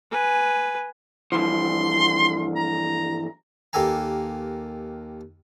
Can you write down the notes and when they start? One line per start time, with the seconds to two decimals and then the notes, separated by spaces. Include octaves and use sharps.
0.11 B4 G#5
1.32 G2 E3 F3 C6
2.56 A#5
3.73 D#2 A#3 G4 A4 G#5 A#5